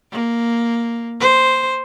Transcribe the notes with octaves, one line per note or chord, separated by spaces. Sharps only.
A#3
C5